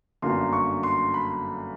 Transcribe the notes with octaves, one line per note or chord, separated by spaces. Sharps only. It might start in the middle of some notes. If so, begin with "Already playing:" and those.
G1 F#2 D3 F#3 A#3 C6
C#6
C6
B5